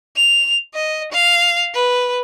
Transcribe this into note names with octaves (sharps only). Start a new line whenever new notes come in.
F7
D#5
F5
B4